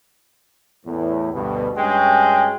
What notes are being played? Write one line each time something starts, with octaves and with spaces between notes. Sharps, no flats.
E2 A2
D2 G2 B2
G2 G#3 C#4 F#4 G5